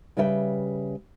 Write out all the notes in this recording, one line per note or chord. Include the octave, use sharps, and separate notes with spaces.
C#3 G3 B4 E5 F5 G5